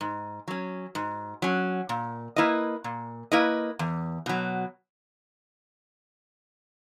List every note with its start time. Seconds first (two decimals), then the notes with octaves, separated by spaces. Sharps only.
0.01 G#2
0.48 F#3 C#4
0.95 G#2
1.42 F#3 C#4
1.89 A#2
2.36 A#3 E4 B4 D#5
2.84 A#2
3.32 A#3 E4 B4 D#5
3.79 E2
4.26 B2 F#3